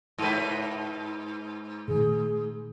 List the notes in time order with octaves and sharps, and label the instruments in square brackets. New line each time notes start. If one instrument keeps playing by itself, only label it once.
[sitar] G#2 B4
[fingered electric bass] A#2 D#3 A3 [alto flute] G#4